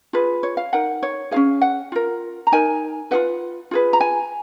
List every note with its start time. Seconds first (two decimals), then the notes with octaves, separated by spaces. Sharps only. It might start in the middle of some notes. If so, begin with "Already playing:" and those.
0.13 F4 G#4 B4
0.43 C#5
0.57 F5
0.73 D#4 A#4 F#5
1.03 C#5
1.31 C#4 F4 G#4 F5
1.61 F#5
1.92 F4 A#4
2.47 A#5
2.52 D#4 A#4 G#5
3.11 F4 G#4 B4 F#5
3.71 F4 G#4 B4
3.93 A#5
4.00 G#5